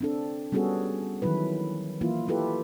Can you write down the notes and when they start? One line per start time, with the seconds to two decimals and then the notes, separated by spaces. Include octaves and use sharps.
0.01 C4 D4 A4
0.52 G3 B3 C#4 F#4 G#4 A4
1.22 D#3 E3 F#3 E4 B4
2.01 E3 A#3 E4 F4
2.28 E4 F4 G4 A4 B4